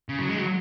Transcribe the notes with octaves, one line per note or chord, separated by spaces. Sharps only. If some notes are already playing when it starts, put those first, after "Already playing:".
C#3
F#3
G#3
F#3